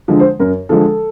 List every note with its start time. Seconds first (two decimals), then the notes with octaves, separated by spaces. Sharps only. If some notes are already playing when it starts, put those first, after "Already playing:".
0.08 D3 F3 G#3
0.19 C5
0.40 F#2 A#4
0.69 D3 F3 G#3 A4